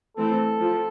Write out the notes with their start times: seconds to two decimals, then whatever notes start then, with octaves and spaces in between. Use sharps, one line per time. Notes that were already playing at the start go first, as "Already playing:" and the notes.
0.17 E3 A3 C4 A4
0.60 F3